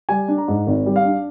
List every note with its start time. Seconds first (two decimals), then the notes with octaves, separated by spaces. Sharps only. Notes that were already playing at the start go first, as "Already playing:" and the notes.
0.09 G3 G#5
0.28 D4
0.38 A#5
0.48 G#2
0.67 G#1
0.86 G3
0.96 F5
1.05 D4